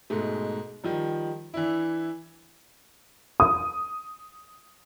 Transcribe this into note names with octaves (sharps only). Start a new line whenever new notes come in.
G#2 B2 G#3 A3
D#3 F3 G3
E3 D4 E4
D#6